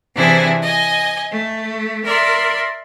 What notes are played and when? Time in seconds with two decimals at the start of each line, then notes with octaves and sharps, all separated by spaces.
0.15 C3 E3 C4 D4 E4 G#4
0.62 D#5 G#5
1.30 A3
2.05 A#4 D5 E5 C6